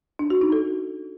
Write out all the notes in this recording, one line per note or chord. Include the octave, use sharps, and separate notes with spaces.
D4
F#4
D#4
A4